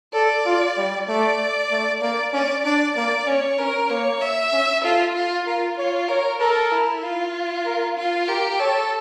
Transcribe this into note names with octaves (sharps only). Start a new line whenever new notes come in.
A4 D5
F4
G3
A3 D5
A3
A#3 D5
C#4 D5
D4 D5
A#3 D5
C#4 C#5
C#4 A#4
A#3 C#5
E5
C#4
F4 A4
F4
F4 A#4
F4 C#5
A#4 C#5
A4 A#4
E4
F4
A#4
F4
G4 A#4
A4 C#5